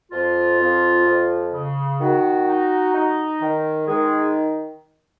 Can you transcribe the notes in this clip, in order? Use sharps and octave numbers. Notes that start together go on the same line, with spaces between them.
F2 F4
F2
F2
C#3
D#3 F#4
D#4
D#4
D#3
D#3 G#3 G#4